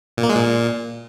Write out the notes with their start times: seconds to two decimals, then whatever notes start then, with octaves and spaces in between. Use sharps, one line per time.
0.17 A#2
0.23 A#3
0.29 G#3
0.35 A#2